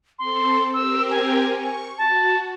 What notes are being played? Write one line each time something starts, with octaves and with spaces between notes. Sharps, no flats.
C4 A4 C6
C4 G4 A#4 E6
G#5
C#6
F#4 A5